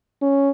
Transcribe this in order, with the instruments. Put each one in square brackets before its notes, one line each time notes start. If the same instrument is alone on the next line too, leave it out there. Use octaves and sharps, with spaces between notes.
[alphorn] C#4